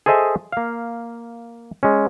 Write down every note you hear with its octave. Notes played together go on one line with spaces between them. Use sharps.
G#4 A4 C5 D#5 E5 G#5
A#3 F5
G#3 C#4